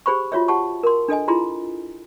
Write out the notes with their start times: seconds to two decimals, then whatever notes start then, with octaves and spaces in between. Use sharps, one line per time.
0.06 G4 G#4 C5 B5 C#6
0.32 F4 F#4 C#5 E5
0.48 G4 F#5 A5 C#6
0.83 A#4 C6
1.08 D4 A4 D#5 G#5
1.28 E4 F4 G#4 A#5 C6